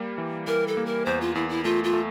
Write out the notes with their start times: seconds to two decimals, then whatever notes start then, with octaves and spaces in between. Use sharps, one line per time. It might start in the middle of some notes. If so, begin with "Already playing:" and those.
Already playing: G3 A#3
0.18 E3
0.47 E3 A#4
0.68 A4
0.77 A#3
0.86 A#4
1.06 E2 C5
1.21 F4
1.35 E2 E4
1.49 E4
1.64 A3 F4
1.84 F4
1.93 A3